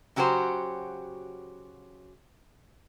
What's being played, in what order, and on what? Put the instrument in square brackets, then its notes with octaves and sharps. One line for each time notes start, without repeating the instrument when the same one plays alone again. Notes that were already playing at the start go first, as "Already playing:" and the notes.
[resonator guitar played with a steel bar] C#3 F#3 F#4 G4 C5